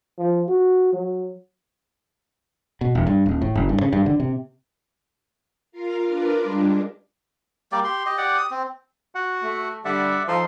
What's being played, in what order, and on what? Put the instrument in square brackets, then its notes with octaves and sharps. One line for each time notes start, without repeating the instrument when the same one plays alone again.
[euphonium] F3
F#4
F#3
[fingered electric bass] B2
E1
G2
D#1
A2
F#1
G2
C#3
G2
D3
C3
[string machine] F4 A#4 F5
D4 F4 A#4 B4 D5
G3 G#3 D4
[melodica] G3 A#3 G4 D5
G4 C6
G4 D#5
G4 D5 F#5
D#6
C4
[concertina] F#4 F#5
[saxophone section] A3
[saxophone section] D3 G3 [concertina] D5 E5 F#5
[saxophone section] F3 [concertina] D#4 A4 C6